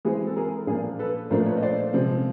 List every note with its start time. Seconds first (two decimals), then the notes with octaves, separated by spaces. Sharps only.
0.05 E3 G#3 C4 F#4 G#4
0.27 A4
0.36 G#4 A#4
0.67 A#2 F3 A#3 D4 G#4 A#4
0.99 A4 B4
1.30 A#2 F3 A3 D4 A#4 C5
1.46 B4 C#5
1.57 D#5
1.63 C5 D5
1.93 C3 F3 G#3 C4